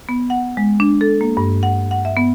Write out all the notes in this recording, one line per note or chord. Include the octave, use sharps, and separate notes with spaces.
B3
F#5
G#3
D4
A4
A#3
G2
F#5
F#5
E5
B3